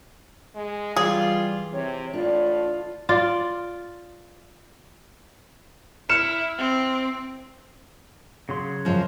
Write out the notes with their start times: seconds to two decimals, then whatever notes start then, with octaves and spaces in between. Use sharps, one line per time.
0.56 G#3
0.96 E3 G3 F4 G#4
1.73 C3 C#5
2.13 A2 D4 F4
3.09 F4 D5
6.10 E4 F6 C#7 E7
6.58 C4
8.49 C#3 F#3 C6
8.85 F#2 F3